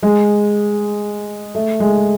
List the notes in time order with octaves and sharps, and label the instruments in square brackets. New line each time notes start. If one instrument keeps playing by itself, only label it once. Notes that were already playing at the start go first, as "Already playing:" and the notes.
[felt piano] G#3
A3
G#3